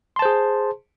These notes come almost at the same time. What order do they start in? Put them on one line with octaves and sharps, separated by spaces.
C6 A5 C5 G#4